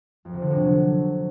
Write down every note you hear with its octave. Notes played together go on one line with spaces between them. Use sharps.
F2
C3
D3
C3
F#3